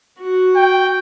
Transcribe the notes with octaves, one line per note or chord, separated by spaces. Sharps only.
F#4
G5